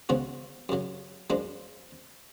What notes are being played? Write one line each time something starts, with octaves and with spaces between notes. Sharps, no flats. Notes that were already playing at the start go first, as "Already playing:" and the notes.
C#2 C#3 F3 B3 F#4
F#2 C#3 F#3
F#2 F3 G#3 D4